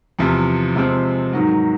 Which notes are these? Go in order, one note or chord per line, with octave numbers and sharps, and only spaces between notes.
E2 C3 F3
C3 F3 G#3 C4
G#2 D#3 F#3